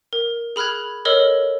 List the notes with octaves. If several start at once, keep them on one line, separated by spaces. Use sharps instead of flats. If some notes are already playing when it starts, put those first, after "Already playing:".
A#4
G#4 B5 F6 F#6 G#6
A4 A#4 C#5 D#5 E6 F6